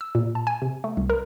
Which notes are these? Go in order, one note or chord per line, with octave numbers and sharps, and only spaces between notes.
E6
A#2
A5
G#5
C3
A3
C2
A#4